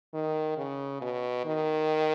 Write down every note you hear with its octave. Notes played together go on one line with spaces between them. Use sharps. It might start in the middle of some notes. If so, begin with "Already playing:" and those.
D#3
C#3
B2
D#3